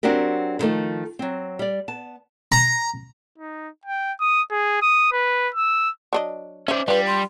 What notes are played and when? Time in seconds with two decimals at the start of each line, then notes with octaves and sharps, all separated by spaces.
0.03 F#3 C4 D4 F#4 G4 A#4
0.59 D3 D#3 F3 A3 D#4
1.19 F#3 C4
1.59 G3 D5
1.88 B3 A5
2.52 A#5
3.38 D#4
3.85 G5
4.20 D#6
4.51 G#4
4.82 D#6
5.12 B4
5.55 E6
6.13 F#3 D4 D#5
6.68 C#4 C5 D5 E5
6.88 G3 D4 F4 B4
7.07 C6